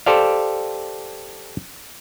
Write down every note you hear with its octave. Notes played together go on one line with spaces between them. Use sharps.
G4 A4 C5 D5 F5